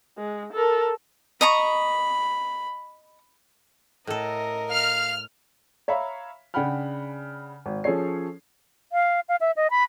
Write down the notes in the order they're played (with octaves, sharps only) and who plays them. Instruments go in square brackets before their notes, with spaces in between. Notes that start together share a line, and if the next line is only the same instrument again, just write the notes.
[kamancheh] G#3
A4 A#4
[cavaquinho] D#5 A#5 C#6 [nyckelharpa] B5
[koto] A2 A4 [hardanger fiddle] A#4 D#5
[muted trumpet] F5 [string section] F6
[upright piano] C#5 E5 F5 A#5 B5
C#3 D4 F#5 G5 B5 F6
G#1
F3 C#4 G#4 A4 C#5 C7
[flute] F5
F5
E5
D#5
B5